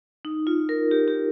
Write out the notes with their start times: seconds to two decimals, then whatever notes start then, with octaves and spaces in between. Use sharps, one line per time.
0.25 D#4
0.47 F4
0.69 A#4
0.91 G4
1.08 G4